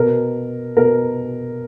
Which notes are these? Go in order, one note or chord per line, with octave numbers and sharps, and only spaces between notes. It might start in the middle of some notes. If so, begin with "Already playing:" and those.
Already playing: B2 A#4
B2 A#4